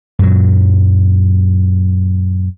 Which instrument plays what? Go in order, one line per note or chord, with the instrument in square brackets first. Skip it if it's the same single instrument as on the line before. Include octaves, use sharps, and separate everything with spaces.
[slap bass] F#2 A#2 F#3